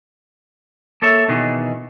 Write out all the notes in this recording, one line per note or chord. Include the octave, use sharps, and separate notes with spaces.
A#3 A4 C#5 E5
B2 D#3 E3 G#4